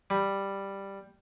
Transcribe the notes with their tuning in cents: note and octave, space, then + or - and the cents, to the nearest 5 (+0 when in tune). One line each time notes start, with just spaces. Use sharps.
G3 +5